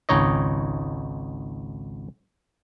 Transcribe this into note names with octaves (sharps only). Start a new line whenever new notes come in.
G#1 C#2 D#4 C#5 D#5